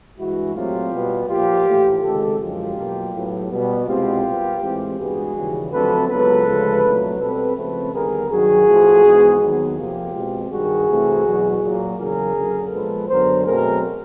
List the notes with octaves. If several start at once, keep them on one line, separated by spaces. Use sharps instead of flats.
G2 E3 G#3 E4 F#4
A#2 F#3 A3 C4 F4 G4
B2 G3 B3
A#2 F3 A#3 F4 G4
A2 E3 A3
C#2 C3 D#3 G#3 G4 A4
F#2 D3 F3 G#3 F4 G4
B2 F#3 A#3
A2 F#3 B3
B2 G3 B3
C2 B2 G#3 C4 F4 G4
A#2 G3 B3
A2 E3 G#3 C4
G2 E3 G#3 B3 F#4 G#4
D#2 C#3 E3 G3
F2 D3 F#3 A3 C4 A4 B4
C#2 C#3 F#3 B3 A4 B4
D2 C#3 F3 G#3
C2 A#2 F#3 A3
B2 G3 C4 A4 B4
C#2 C#3 F3 A3 C4 A4 B4
D#2 D3 G3 B3 G#4 A#4
G2 D#3 F#3 F#4 G#4
A2 F3 A3
G#2 E3 G#3 B3
D#2 D#3 F#3 B3
F2 C3 F3 A#3 F4 G4
B2 G#3 C4
G2 D#3 G3 F#4 G#4
C2 C3 E3 A3
E2 B2 F#3
A#2 F#3 A#3
E2 C#3 F#3 A#3 G#4 A#4
F#2 D3 F#3 A#3
A#2 F3 G#3 B3 A4 B4
F#2 D3 F#3 B3 A#4 C5
B2 F#3 A3 C4 G#4 A#4